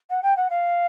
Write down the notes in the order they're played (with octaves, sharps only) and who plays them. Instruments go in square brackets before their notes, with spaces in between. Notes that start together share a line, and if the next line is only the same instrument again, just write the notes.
[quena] F#5
G5
F#5
F5